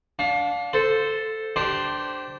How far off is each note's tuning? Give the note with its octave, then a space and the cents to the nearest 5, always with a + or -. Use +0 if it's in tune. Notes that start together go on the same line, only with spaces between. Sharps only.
D4 -20 F5 +30
A4 +0 C5 -10
D4 +0 G4 -20 C5 +0